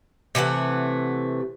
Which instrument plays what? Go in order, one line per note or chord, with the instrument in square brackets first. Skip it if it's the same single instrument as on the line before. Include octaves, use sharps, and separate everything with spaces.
[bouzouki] C3 E3 A3 F#5